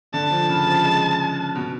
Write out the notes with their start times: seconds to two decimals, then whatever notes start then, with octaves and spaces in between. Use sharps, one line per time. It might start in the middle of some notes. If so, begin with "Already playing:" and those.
0.14 D3 A5
0.31 F3
0.49 C#3
0.67 F3
0.84 G#3
1.55 B2